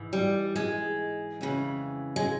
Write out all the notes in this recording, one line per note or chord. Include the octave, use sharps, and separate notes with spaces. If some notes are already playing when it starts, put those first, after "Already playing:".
Already playing: G#2 E3
G3
G#3
F2 C#3 E3
G#3